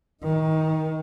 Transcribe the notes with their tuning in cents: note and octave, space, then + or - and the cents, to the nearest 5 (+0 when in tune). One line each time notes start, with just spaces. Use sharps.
D#3 +25 D#4 +0